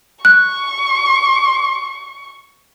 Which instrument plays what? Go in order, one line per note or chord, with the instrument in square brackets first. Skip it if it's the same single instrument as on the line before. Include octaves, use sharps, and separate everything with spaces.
[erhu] C#6 [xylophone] F#6